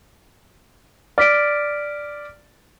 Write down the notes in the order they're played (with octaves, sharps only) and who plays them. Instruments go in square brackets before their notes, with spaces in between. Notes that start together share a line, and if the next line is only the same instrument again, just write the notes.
[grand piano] D5 [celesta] F6 B6 D7